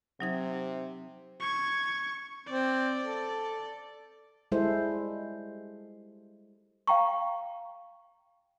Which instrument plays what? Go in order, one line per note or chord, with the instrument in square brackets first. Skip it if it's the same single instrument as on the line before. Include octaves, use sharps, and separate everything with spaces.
[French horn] C3 [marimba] F#3 D#4 G#6
[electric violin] C#6 G#6
[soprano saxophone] C4 [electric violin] D5
[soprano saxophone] A4
[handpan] G3 G#3 E4 A4 C5
[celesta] F5 G5 A#5 C#6